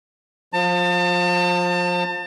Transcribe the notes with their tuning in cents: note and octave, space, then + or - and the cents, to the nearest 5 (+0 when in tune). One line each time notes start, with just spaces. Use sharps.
F3 +20 A5 +35